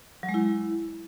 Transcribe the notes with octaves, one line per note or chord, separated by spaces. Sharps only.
F#3
G#3
E4